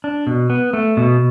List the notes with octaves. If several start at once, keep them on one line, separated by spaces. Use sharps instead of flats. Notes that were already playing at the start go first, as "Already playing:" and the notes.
D4
B2
B3
A3
B2